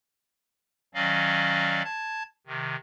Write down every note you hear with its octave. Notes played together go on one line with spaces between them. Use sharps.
D#3 F#3 C#4 D5 D#5 F5
A5 G#6
C3 D#3